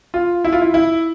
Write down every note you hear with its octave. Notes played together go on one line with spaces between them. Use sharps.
F4
E4
F4
E4
E4